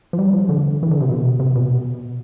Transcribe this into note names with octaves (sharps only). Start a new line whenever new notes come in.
F3
G3
F3
D3
E3
D3
C3
B2
C3
B2